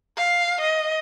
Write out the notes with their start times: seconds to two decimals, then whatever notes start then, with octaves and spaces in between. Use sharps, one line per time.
0.17 F5
0.61 D#5